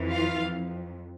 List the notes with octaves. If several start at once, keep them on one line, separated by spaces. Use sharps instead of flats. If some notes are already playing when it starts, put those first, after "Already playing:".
Already playing: F2 E3
F4 F5
F2